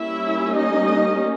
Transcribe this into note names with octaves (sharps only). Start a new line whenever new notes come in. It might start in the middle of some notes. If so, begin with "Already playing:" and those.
Already playing: G3 A#3 C#4 E4 E5
D#4 D#5